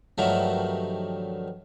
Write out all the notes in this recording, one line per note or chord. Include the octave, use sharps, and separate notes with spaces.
G2 D#3 F3 F#3 A3